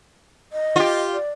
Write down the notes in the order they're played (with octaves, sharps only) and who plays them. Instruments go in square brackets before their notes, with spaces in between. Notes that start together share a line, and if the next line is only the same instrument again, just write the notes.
[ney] D#5
[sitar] F4 G4
[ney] D5